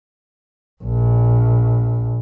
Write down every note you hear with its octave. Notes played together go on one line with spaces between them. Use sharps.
A#1